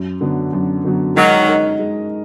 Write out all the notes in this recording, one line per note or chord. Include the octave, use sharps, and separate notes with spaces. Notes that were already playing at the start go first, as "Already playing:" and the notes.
Already playing: F#2
D3 F#3 B3
F#2
D3 F#3 B3
D#3 F#3 G#3
D#4 A#4 D#5
G#3